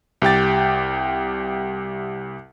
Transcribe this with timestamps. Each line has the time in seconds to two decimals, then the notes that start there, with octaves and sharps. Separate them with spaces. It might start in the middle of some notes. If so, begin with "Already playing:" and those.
0.22 C2 G4 G5 A6